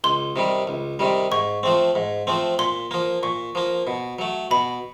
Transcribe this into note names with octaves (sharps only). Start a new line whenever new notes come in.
C#2 C6
C3 D#3 G3
C#2
C3 D#3 G3
G#2 C#6
F3 A3 C4
G#2
F3 A3 C4
A#2 C6
F3 A#3
A#2 C#6
F3 A#3
B2
F#3 A3
B2 B5